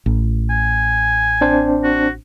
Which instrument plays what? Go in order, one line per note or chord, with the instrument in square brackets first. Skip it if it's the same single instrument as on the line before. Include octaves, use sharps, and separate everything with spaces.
[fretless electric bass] A1
[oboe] G#5
[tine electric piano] C4 D4 C5
[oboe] F#4